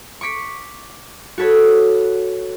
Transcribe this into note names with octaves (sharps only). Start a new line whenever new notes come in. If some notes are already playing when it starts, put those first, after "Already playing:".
C#6 D6 B6 C#7
F#4 A4 B4 C#5